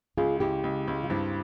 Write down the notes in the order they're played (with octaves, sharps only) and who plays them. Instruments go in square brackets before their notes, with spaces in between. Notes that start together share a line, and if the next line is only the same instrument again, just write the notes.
[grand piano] C#2 [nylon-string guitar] F4 G#4
[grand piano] C#2 [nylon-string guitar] E4 G4
[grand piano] C#2
C#2
[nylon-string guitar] F4
[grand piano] G2 [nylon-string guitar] C4 E4